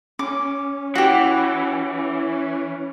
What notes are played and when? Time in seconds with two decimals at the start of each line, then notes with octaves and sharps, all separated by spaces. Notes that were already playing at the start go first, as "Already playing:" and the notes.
0.19 C#4 D6
0.95 E3 F#4 G4